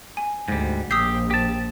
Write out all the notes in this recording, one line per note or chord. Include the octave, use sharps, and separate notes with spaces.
G#5
D2 G#2 G3
A#1 G4 D#6 E6 C7
G4 A5